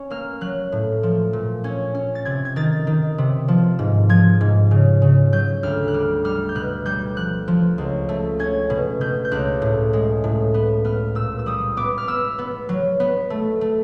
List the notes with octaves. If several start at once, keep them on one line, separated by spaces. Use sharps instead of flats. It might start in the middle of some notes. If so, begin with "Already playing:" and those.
Already playing: C#4
A#3 F6
F#3 F#6
A2
F3
A#2
C#4 G#6
C#4
A6
C3 G#6
G#6
D#3 A6
D#3
C3
F3
G#2
F3 G#6
G#2
C#3
C#3
F#3 G6
D2 F6
F#6
G3 F6
G3 F6
G6
B2 F#6
G3 G6
F3 F#6
F3
C#2
A3
C#4 G#6
B2
B2 G6
G6
C#2 F#6
A2
G#3
A2
B3
B3 F6
A#2 E6
E6
G3 D#6
B3 D6
F6
B3 E6
B3
F#3
B3
A3
A3